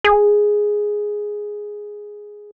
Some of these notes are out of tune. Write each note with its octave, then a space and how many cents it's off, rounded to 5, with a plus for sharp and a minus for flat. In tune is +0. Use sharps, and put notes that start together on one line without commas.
G#4 +0